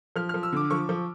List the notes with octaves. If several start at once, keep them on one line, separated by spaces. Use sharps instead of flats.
F3 F6
F6
F3
E6
D3 D6
F3 C#6
F3